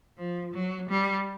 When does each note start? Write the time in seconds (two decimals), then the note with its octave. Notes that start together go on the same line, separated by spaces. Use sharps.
0.17 F3
0.54 F#3
0.89 G3